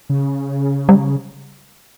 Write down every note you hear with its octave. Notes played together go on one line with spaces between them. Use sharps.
C#3
G3